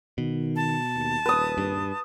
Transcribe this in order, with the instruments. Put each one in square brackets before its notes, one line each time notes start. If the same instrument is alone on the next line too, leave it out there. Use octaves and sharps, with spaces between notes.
[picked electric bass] B2 [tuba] D#3
[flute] A5
[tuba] D#2
[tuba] D#1 [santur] B4 D#6
[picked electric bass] G2